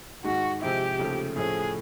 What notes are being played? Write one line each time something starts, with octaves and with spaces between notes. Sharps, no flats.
G#2 D#3 G#3 F#4
C3 F3 G#3 C4 E4 G4
D#2 C#3 F3 A3
A2 F3 A3 C#4 G#4